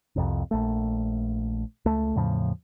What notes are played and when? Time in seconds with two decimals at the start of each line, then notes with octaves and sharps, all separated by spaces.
0.16 C2 F2 C3
0.51 A#1 A3
1.85 C#2 A3
2.15 E2 A2 C#3 F3